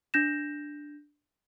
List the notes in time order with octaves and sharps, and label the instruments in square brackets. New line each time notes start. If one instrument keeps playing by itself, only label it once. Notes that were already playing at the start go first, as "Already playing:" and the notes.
[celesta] D4 G6 A#6 E7